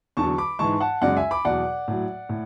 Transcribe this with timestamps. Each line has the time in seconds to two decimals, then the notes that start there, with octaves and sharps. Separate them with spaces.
0.17 E2 D3 F#3 A5 C#6
0.38 B5 D6
0.59 G#2 E3 G#3 A5 C#6
0.80 F#5 A5
1.02 F#2 C#3 G#3 D5 F#5
1.16 E5 G#5
1.31 B5 D6
1.45 E2 B2 F#3 D5 F#5
1.88 A2 F#3
2.29 A2